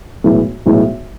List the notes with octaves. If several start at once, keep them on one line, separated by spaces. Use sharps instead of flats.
B1 A2 E3 G#3
B1 A2 E3 G#3